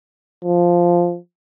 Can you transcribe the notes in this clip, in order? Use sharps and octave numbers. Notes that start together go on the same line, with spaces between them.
F3